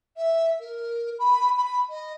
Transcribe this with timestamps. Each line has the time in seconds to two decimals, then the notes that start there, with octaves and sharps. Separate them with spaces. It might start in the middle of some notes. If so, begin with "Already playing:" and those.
0.17 E5
0.60 A#4
1.19 B5
1.57 B5
1.90 D#5